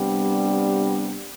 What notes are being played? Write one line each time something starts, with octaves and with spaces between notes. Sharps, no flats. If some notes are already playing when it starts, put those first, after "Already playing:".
Already playing: C3 G3 B3 D4
G4